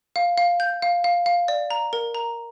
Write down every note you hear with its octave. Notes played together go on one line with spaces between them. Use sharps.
F5
F5
G6
F5
F5
F5
D5
A#5
A#4
A#5